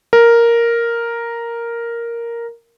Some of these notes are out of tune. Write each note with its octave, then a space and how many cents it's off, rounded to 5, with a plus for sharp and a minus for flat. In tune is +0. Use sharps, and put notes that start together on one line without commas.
A#4 +0